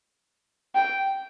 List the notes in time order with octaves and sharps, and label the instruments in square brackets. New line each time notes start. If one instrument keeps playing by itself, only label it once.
[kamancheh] G5